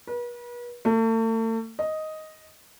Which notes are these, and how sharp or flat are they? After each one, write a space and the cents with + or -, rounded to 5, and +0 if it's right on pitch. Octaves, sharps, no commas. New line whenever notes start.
B4 -40
A3 +40
D#5 +5